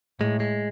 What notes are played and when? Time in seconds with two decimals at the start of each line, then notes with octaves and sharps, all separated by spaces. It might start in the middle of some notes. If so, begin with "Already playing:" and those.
0.20 A2 G#3
0.40 G#3